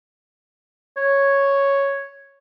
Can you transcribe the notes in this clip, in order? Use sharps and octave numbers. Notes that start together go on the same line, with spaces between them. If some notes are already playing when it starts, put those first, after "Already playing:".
C#5